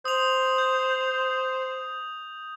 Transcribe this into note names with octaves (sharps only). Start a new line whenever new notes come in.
C5 D#6 F7
G6